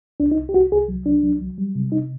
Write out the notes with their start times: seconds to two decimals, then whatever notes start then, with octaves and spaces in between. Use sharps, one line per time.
0.20 C2 D4
0.31 D#4
0.38 C2
0.49 G4
0.54 C2 F#4
0.72 C2 G#4
0.88 F#3
1.06 C2 D4
1.23 F#3
1.41 F#3
1.58 G3
1.75 C3
1.92 C3 D#4